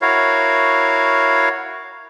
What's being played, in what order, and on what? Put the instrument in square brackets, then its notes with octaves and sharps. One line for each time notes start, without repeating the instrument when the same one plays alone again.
[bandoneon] E4 F#4 A#4 C#5 F5